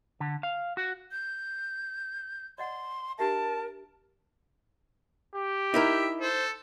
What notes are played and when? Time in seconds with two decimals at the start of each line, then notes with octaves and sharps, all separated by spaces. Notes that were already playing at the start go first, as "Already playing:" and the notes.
0.20 D3
0.43 F5
0.77 F#4
1.12 G6
2.58 D5 D#5 F#5 C6
3.19 D4 G4 A#4 E5 A5
5.35 G4
5.74 D#4 E4 A#4 E5
6.21 A4 C5